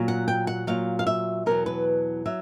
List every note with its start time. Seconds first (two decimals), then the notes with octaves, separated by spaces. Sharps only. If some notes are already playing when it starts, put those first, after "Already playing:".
Already playing: A#2 F#3
0.08 F#5
0.28 G5
0.47 F#5
0.67 A#2 F#3 F5
0.99 F5
1.07 E5
1.46 E2 B2 F#3 A#4
1.66 B4
2.26 F#3 E5